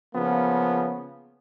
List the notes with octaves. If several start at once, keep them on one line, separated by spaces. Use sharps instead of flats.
C#3 F3 A#3 B3